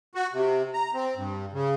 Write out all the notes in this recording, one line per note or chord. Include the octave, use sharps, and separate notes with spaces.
F#4
C3
A#5
C4
G2
C#3